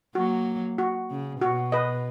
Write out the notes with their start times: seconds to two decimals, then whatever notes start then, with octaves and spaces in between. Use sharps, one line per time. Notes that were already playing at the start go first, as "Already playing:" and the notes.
0.15 F#3 A#3 F#4
0.78 F#4
1.10 C#3
1.41 B2 F#4
1.72 B4 D#5